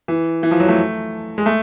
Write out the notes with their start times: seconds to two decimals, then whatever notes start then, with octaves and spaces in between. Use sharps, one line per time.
0.08 E3
0.43 E3
0.51 F3
0.60 F#3
0.68 A3
1.38 G#3
1.46 A3